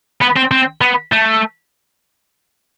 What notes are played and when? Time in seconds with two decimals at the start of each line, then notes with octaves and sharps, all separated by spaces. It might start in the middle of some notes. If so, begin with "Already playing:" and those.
0.21 B3
0.36 C4
0.51 C4
0.81 B3
1.12 A3